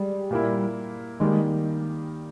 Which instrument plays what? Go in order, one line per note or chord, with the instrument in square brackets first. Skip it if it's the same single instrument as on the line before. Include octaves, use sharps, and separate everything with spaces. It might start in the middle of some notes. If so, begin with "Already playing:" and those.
Already playing: [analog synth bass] G3 [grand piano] G#3
[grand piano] A#2 A#3 E4
[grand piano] D#3 G3 A#3 [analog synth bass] G#3